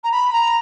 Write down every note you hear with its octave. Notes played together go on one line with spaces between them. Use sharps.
A#5
B5
A#5